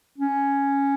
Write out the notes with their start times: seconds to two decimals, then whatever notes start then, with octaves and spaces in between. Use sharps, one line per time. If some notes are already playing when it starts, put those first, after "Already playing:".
0.18 C#4